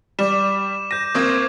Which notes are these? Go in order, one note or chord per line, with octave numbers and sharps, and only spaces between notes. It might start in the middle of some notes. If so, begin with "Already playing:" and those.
G3 D6 E7
G6 A#6 D#7
F#1 A#3 C4 C#6 D#6 G#6